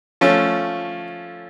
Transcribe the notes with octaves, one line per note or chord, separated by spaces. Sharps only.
F3 A3 C#4